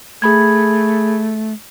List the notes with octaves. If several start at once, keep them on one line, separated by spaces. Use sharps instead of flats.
A3 G#4 B5 G#6